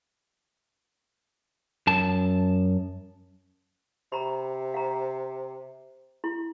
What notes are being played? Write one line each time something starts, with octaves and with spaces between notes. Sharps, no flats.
F#2 A5
C3 A#5 B5
F5 A#5
E4